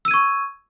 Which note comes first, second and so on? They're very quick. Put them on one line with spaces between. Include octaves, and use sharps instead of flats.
E6 D#7 G#6 C#6